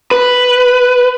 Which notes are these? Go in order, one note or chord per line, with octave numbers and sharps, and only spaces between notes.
B4